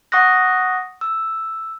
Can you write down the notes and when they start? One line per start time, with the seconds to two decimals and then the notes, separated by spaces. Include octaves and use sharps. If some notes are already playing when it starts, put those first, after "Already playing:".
0.12 F#5 C#6 D#6 F#6 A#6
1.01 E6